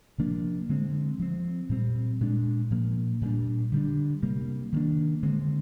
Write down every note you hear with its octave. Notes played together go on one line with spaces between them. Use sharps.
C3 F3 A#3 D4
D3 G#3 C4
F3 C4
A#2 G3 C4
A#2 G#3 D4
A#2 F3 A#3
A#2 G3 D4
D3 G3 D4
C3 G3 A#3
D#3 G3 A#3 D4
D3 G#3 C4